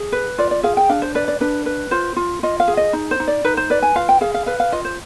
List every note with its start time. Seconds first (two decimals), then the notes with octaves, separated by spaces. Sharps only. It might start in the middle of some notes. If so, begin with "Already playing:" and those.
Already playing: G#4
0.12 B4
0.38 F4 D5
0.51 D5
0.63 G#4 F5
0.77 G5
0.89 D4 F5
1.02 C5
1.15 B4 D5
1.28 D5
1.41 D4 B4
1.66 B4
1.91 F4 C5
2.16 F4
2.43 F4 D#5
2.60 F5
2.68 G#4
2.77 D#5
2.93 D#4
3.11 C5
3.20 D#4
3.28 D5
3.45 D#4 B4
3.57 C5
3.70 B4 D5
3.83 G#5
3.96 F4 F5
4.09 G5
4.21 G#4 F5
4.34 F5
4.46 B4 F5
4.60 F5
4.72 F4 D#5
4.85 C5